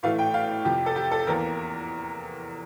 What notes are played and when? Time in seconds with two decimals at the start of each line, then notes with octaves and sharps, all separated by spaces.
0.03 A2 E3 A3 E4 F5
0.18 G5
0.34 F5
0.65 F2 C3 F3 G4
0.86 A4
0.96 G4
1.11 A4
1.27 E2 E3 A#3 A#4